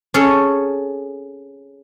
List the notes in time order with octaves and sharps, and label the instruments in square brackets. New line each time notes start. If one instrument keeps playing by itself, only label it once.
[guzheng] C#4 G#4 A4 C#5